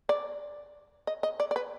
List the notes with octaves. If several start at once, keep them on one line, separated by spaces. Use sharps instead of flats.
D5
D#5
D#5
D5
D5
B4